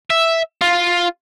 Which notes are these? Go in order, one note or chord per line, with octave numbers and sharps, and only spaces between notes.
E5
F4